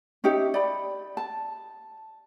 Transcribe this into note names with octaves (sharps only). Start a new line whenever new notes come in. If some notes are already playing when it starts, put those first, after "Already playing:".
C#4 D#4 G4 E5
D5 B5
A5